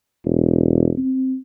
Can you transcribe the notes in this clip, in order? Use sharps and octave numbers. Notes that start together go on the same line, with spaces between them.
E1
C4